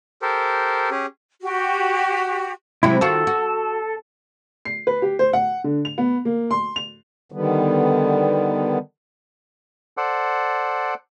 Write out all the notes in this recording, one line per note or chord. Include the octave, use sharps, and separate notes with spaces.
G4 A4 A#4 C5
C#4 G4 G#4
F#4 G4
C3 F#3 G#3 E4
D#3 F4 F#4 A4
F#4
C7
B4
G4
C5
F#5
D3
F7
B3
A#3
C6
F7
D3 D#3 G3 B3
A4 C5 D5 F#5